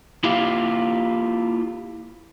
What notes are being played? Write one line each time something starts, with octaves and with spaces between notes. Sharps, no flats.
A#3 E4 F4 G4 F5